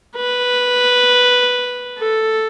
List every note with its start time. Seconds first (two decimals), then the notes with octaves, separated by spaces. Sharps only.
0.16 B4
1.99 A4